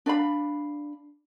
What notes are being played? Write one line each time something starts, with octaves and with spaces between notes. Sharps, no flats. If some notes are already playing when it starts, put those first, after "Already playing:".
D4 D5 F5 B5